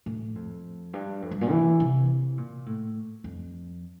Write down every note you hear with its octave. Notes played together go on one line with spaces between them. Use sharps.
A2
F2
G2
F2
G2
A#2
E3
C3
A#2
A2
F2